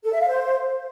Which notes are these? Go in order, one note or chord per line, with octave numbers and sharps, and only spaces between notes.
A4
E5
F5
C5